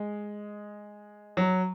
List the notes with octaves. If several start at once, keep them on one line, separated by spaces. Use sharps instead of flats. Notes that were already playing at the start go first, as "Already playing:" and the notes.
Already playing: G#3
F#3